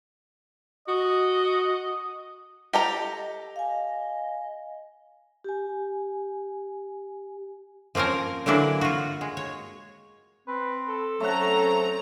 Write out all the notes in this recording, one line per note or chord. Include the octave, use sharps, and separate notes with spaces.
F#4 D#5
G4 A4 D#5 A#5
F5 G#5
G4 G#5
F3 A#3 C4 C#4 A#4
D3 E3 F#3 A#3 D4 E4
F4 F#4
G#3
C#5
C4 B4
A4
F#3 A3 C4 C#4 F#5 A#5